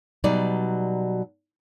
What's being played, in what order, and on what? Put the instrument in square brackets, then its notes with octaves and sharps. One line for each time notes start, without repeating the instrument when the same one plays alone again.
[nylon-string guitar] B2 F#3 G3 D#4 D5